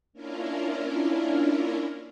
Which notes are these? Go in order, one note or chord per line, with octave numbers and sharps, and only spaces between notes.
A#3 C#4 D4 E4 F4 A#4